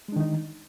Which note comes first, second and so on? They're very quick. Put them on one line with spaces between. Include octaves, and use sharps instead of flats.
G#3 D4 D#3 D#4